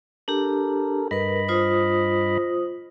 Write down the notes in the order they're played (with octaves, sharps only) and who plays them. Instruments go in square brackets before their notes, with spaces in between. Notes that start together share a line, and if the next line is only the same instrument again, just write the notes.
[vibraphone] D4 G4 [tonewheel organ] A4 A#4
[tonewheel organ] G2 D#5 B5 [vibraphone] A#4 B4
[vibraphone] F4 C5 D#6